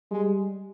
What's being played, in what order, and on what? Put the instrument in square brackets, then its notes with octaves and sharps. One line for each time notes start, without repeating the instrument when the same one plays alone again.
[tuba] G3 [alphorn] G#3